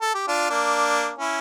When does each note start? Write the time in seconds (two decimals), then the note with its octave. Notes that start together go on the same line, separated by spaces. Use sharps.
0.01 A4
0.15 G4
0.27 D4 F4
0.50 A#3 D4
1.18 C#4 E4